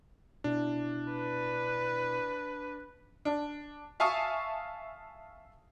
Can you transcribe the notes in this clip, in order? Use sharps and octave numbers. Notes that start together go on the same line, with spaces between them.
B2 D4 E4
B4
D4
E5 F5 G#5 A5 C#6 D#6